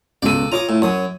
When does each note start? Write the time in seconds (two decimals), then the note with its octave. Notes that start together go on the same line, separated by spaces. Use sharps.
0.22 C#2 B2 A4 D5 D#7
0.52 F4 C#5 A#5 D6 D#6
0.69 A2
0.82 F#2 C#5 D#6